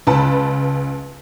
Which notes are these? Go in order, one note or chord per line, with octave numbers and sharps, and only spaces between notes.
C#2 B4 A5